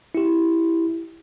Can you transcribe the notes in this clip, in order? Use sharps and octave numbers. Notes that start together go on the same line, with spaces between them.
E4 G4